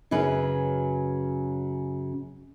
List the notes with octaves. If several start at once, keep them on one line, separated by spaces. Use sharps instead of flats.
F#2 C#3 F#3 B4